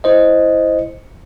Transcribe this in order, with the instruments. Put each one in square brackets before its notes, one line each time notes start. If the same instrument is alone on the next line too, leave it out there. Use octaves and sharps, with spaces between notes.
[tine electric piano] E4 C5 D#5